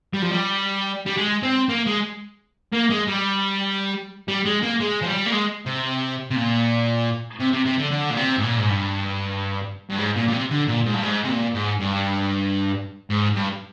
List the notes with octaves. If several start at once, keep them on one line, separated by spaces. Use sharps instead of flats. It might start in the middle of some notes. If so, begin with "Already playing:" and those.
G3
F3
G3
G3
G#3
C4
A#3
G#3
A#3
G#3
G3
G3
G#3
A#3
G#3
F3
G3
A#3
G#3
C3
C3
A#2
C3
C3
C3
D3
D3
A#2
C3
G#2
A#2
G#2
G2
G2
G#2
A#2
A#2
C3
D3
A#2
G#2
G2
G#2
C3
A#2
G#2
G2
G#2
G2